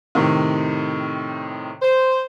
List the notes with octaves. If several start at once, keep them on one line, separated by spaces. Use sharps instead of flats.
A2 C3 D#3
C5